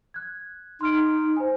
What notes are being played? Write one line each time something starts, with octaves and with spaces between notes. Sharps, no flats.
F#6 G#6
D#4 C6 F6 D7
C5 G#5